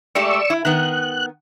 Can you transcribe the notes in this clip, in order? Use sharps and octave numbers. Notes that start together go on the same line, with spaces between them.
G#3 A3 G4 D5 C#6 E6
E4
D#3 B3 F#6